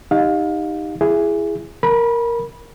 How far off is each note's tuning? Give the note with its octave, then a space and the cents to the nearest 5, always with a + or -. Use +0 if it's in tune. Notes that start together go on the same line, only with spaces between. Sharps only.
D#4 +0 G4 +0 F5 +25
E4 +25 G#4 +0
A#4 +0 B5 -25